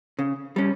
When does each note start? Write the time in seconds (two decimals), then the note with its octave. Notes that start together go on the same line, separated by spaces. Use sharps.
0.19 C#3
0.56 G3 C#4